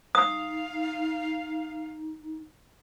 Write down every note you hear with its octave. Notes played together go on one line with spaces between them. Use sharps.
D#4 F5 D#6